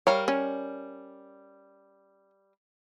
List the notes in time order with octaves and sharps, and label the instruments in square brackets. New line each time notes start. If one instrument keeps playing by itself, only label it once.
[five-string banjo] G3 A#4 F5 [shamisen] C#5
[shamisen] C#4